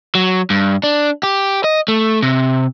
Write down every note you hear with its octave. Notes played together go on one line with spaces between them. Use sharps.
F#3
G2
D4
G4
D#5
A3
C3